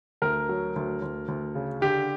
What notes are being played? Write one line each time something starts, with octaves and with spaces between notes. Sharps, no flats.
D2 A#4
F#3
D2
D2
D2
C#3
D3 G4